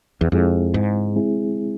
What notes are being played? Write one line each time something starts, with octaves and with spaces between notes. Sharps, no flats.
E2
F2 G#3 C4 E4 G#4
G#2
G#3 C4 E4 G#4